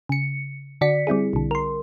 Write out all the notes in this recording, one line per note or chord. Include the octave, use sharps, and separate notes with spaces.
C#3 C#7
D3 F#4 D5 B6 C#7
G3 C4 E4 G#4
B1 D3
A#4 C6